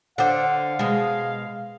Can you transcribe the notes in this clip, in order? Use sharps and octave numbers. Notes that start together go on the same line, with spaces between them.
D3 C5 D#5 F5 F#5 D6
B2 G#3